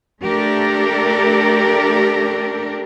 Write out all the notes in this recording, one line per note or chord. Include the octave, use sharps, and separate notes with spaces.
A3 D4 G4 A4 A#4